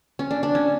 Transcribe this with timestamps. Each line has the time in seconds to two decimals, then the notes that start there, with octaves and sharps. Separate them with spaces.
0.19 C#4
0.31 D4
0.43 D4
0.55 C#4